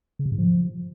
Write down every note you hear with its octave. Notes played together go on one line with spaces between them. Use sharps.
C#3
C3
G#2
F3